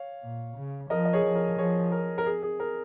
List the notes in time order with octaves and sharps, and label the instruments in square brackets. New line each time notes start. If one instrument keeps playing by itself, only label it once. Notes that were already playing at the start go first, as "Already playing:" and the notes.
Already playing: [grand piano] C#5 F5
[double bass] A#2
C#3
[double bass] F3 [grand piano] A#4 D#5
[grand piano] D#5
G#4 C#5
[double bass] F3
[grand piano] A#4
[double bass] F3 [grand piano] G#4 C#5
[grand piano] A#4
A#4
G#4
G#4
A#4